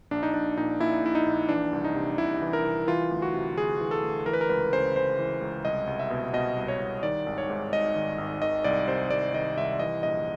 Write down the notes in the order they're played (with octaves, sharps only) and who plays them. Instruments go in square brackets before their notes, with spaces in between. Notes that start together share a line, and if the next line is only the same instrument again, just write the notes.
[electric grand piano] A#1 D4
D#4
A#1 D4
A#2 D#4
A#2 E4
A#1 E4
D#4
A#1
E3 D4
C2
D#4
C3
C2 E4
E3
A#4
C2
E3 F4
D2
F#4
C3
D2 G#4
E3
A4
D2
E3 A#4
B4
A#4
C#2 B4
C#3 C5
C#2 C5
E3
C#2
C2 D#5
C2
E5
B2
B2 D#5
C2
C#5
C2
D#3 D5
G#1
C#5
G#2
G#1 D#5
D#3
G#1
D#3 D#5
C2 D5
C3 C5
C2 D5
D#3 D#5
C2 E5
E3 D#5
A#1 D#5